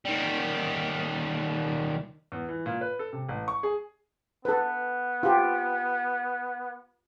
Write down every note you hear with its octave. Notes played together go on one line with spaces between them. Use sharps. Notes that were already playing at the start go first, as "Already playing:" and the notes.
D#3 G3
E2
E3
A#2
B4
A4
C3
A1
C#6
G#4
B3 A4 B4
F4 G4